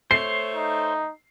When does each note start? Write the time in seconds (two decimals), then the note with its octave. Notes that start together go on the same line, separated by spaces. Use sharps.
0.11 A3 C5 C#5 C7
0.55 D#4